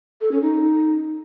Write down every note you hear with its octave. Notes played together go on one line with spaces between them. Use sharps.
A4
C#4
D#4